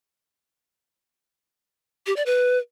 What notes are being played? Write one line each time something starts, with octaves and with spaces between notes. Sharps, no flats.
G4
D5
B4